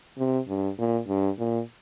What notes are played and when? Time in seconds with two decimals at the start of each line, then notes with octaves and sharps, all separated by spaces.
0.18 C3
0.48 G2
0.79 A#2
1.09 G2
1.39 A#2